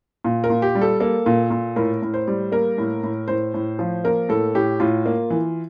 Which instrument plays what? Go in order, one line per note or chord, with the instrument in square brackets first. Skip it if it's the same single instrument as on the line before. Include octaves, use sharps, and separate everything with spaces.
[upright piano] A#2
A#4
A#2
G4
G3
A4
A#3 A4
A#2
A#2
A2 A#4
A2
C5
G3
A#3 A#4
A2
A2
A2 C5
A2
F3
A#3 A#4
A2 A4
A2 G4
A2 F4
A#3
E3